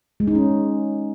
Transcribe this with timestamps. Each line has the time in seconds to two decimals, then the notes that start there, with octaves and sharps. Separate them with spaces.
0.20 G#3
0.28 D#4
0.35 C#4